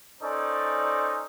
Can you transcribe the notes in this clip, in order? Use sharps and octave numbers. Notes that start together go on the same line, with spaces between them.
C#4 D#4 A4 C5 D5